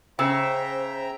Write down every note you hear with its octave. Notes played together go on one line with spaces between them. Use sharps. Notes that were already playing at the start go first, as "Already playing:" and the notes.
C#3 C5 E5 G5 A#5 E6